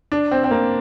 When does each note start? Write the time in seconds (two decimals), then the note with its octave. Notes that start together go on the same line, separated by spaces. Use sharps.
0.12 D4
0.31 C4
0.44 C4
0.51 A#3